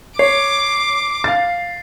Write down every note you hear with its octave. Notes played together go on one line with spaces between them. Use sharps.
C#5 D6 C7
F5 A6